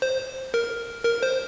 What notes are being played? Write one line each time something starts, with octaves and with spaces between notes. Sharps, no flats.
C5
A#4
A#4
C5